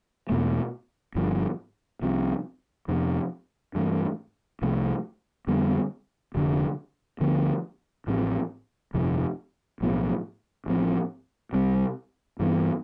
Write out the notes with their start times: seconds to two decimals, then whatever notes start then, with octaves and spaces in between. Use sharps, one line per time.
0.29 E2 B2 A3
1.15 G1 G2 F3
2.02 C2 C3 F3
2.88 F2 C3 F3 B3
3.75 G2 E3 A3
4.62 C2 C3 F3 A3
5.47 F2 D3 G3 B3
6.35 F1 F2 D3
7.20 D2 D3 F3 B3
8.07 A1 A2 F3 C4
8.94 G1 F2 C3 F3
9.81 B1 A2 F3 B3
10.66 A1 A2 F3 C4
11.53 C2 C3 G3 C4
12.40 G2 E3 B3